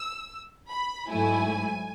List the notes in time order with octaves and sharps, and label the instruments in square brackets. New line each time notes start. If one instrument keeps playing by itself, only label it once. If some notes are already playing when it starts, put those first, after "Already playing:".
Already playing: [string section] E6
B5
G#2 F#3 A3 E4 G#5